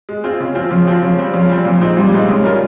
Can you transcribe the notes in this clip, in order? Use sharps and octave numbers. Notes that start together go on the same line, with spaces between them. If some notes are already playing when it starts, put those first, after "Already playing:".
G#3
C4 F4 G#4
C#3
F3 C4 F4
C#3 F3
F3 C4 F4
C#3 F3
G3 C4
C#3 F3
G3 C4
A#2 F3
G#3 C4 D#4
A#2 G3
G#3 C4 D#4
C#3 G#3
G3 C#4 F4 A#4